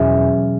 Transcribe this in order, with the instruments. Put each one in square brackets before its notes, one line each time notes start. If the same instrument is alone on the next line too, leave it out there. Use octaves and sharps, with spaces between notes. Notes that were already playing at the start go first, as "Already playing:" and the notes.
Already playing: [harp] E2 B2 F#3 C#4